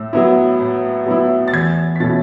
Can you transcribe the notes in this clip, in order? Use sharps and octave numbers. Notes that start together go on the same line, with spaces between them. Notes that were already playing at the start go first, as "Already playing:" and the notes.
Already playing: A2 E6
F#3 B3 E4
A2
F#3 B3 E4
A6
E2 G#6
B6
B2 A3 C#4 E4 A6